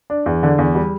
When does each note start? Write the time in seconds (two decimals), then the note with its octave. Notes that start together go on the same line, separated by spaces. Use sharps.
0.10 D4
0.26 E2
0.43 D3
0.58 E2
0.75 G3